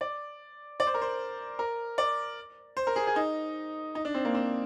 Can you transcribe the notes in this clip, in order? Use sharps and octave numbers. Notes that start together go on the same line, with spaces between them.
D5
D5
C5
A#4
C5
A#4
D5
C5
A#4
G#4
G#4
D#4
D#4
D4
C4
A#3
C4